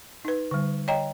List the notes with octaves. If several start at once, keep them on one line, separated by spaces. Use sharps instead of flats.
D#4 B4
D3 G3
C#5 D#5 G5 A#5